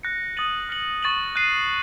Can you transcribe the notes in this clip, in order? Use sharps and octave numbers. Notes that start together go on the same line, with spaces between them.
F#6 A#6 C#7
D#6 A6 D#7 F#7
F6 A#6 C#7 F#7
C#6 A6 D#7 F#7
F#6 C7 D#7